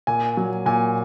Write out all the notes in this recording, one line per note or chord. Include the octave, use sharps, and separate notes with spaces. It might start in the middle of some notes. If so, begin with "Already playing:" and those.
A#2 G#5
F#3
A#2 G#5